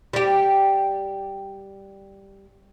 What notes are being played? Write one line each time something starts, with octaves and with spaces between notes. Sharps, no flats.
G3 G4